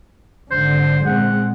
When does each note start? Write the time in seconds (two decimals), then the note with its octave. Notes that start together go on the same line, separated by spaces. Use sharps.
0.51 G#1 D3 C5
1.06 A#2 G#3 C4 F#5